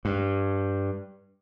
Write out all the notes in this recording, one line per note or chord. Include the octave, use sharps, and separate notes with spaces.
G2